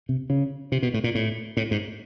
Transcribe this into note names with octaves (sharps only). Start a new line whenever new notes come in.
C3
C#3
C3
B2
A2
A#2
A2
A2
G#2